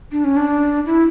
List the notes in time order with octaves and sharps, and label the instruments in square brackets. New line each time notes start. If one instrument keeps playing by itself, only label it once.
[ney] D4
C#4
D4
E4